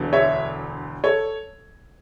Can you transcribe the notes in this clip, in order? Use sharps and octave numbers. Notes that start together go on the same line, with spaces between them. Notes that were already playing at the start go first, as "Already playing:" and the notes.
Already playing: E1 D2 D3
C#5 E5
A4 C#5